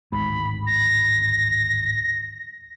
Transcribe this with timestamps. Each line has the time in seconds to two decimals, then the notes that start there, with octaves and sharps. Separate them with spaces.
0.12 D1 G#1 G#2 B5
0.67 A#6